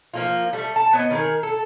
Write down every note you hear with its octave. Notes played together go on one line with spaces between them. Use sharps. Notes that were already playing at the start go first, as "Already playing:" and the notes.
F3 A#3 F4
G3 A3
A5
B3 C#5 D#5
D#3 G#4 A#4
A4